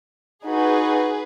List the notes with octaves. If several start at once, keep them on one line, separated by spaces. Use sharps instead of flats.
D#4 F#4 G#4 B4